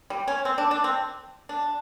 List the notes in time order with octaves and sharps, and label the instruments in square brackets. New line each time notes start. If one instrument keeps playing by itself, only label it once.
[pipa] G3
C#4
C4
D4
D4
C4
D4